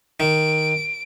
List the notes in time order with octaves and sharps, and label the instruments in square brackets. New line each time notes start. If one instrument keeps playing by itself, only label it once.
[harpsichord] D#3 [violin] D7